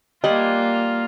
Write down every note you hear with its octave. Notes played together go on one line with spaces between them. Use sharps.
G3 A#3 F4 D#5 F#5 G#5